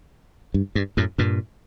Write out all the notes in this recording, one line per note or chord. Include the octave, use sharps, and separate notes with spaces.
G2
G2
F#2 A2
G2 A#2